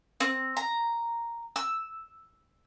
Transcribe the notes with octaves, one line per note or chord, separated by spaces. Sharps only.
C4
A#5
E6